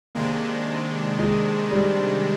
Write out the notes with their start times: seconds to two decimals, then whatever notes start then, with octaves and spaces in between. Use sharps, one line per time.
0.15 C3 D#3 G#3 A#3 D4
1.19 G#3
1.71 G3